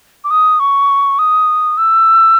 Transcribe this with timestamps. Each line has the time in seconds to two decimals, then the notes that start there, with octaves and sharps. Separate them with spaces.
0.24 D6
0.31 D#6
0.60 C#6
1.19 D#6
1.78 E6